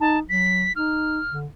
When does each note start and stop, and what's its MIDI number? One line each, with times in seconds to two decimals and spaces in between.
0.01 0.18 63
0.01 0.20 81
0.29 0.66 54
0.29 0.73 95
0.76 1.20 63
0.76 1.37 89
1.31 1.46 50